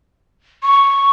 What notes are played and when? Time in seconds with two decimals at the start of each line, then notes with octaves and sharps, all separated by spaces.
0.63 C#6